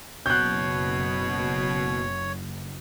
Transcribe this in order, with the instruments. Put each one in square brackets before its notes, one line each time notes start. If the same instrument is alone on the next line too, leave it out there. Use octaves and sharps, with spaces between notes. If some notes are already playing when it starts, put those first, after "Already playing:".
[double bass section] F#1 [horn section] B2 [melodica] C#5 [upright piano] F#6 G6